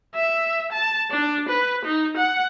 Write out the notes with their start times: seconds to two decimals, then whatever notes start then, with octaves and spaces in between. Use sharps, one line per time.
0.15 E5
0.72 A5
1.11 D4
1.49 B4
1.85 D#4
2.17 F#5